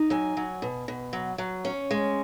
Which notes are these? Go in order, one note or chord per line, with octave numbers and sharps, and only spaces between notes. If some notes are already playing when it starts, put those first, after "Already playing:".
Already playing: D#4
F#3 G#5
F#3
B2
B2
F#3
F#3
C#4
G#3